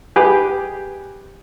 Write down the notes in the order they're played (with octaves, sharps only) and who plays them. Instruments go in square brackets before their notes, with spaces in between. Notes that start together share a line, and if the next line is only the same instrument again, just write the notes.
[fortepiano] G4 G#4 B4